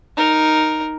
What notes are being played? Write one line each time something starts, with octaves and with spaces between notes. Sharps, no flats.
D#4 A#4